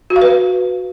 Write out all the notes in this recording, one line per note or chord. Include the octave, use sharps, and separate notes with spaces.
F#4
F5
B4